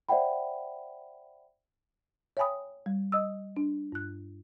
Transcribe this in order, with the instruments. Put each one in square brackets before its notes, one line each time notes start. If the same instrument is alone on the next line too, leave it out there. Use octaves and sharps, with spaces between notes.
[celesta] C5 D5 E5 F#5 G5 B5
[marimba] C#5 E5 G5 G#5 B5 D#6
G3
D#5 D#6 E6
D4
G2 F#6